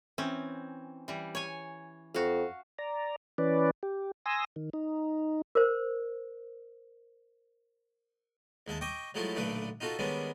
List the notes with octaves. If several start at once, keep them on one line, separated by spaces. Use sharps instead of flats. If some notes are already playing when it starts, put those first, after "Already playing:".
E3 C4 C#4
E3 G3
C#5 G#5
F2 F#4 F5
D5 A#5
E3 C#4 B4 D5
G4
G#5 C6 D#6 E6 A#6
D#3
D#4
A#4 C5
D#2 G#3 E5 A5
D#5 G5 C#6 D6
F3 F#3 G#3 A3 E4 F4
B1 A#2 D3 A3 D4 B4
D#4 F4 F#4 A4 E5
D#3 G3 G#3 B3 C#4 D4